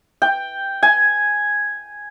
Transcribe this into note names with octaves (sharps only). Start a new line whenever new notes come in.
G5
G#5